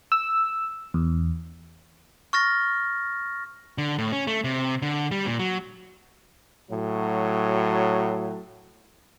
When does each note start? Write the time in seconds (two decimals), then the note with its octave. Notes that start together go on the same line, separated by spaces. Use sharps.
0.12 E6
0.94 E2
2.33 C#6 F6 A6 A#6
3.78 D3
3.98 A2
4.12 C#4
4.27 A3
4.44 C3
4.82 D3
5.11 G3
5.26 A#2
5.39 F#3
6.70 A2 F#3